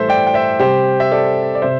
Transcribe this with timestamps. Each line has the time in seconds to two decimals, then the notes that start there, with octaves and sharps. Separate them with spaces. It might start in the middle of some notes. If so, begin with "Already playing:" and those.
Already playing: A2 E3 G3 A4 C5 E5
0.09 D5 G5
0.27 G5
0.34 C5 E5
0.60 C3 G3 G4 C5
1.00 E5
1.12 A4 D5
1.55 D5
1.62 C3 C5 E5